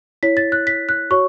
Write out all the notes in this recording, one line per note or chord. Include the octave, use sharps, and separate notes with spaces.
E4 C#5 B6
A6
F#6
B6
F#6
F#4 C#5 C#6